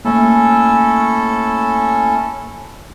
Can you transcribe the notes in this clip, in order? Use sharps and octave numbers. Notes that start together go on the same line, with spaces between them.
A3 A#3 C#4 E4 A4